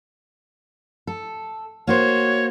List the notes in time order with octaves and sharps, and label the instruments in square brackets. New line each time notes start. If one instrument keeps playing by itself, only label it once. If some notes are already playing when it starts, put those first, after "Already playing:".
[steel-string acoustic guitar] A4
[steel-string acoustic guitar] A#3 F#4 C5 [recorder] C#5